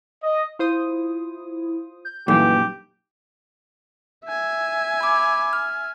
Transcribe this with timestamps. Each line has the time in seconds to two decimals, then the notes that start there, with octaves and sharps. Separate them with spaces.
0.23 D#5
0.59 E4 F4 C5 D#6
2.05 G6
2.28 F#2 A#2 E3 G3 A3 D#4 G4
4.25 E5 G#5
5.01 B5 D6
5.53 F6